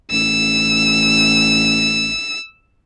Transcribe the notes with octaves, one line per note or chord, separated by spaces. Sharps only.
A1 E6